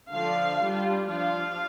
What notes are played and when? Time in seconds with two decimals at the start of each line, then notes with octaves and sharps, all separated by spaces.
0.11 D3 F3 D4 F5
0.61 G3 D4 F4
1.09 F3 D4 F4 F5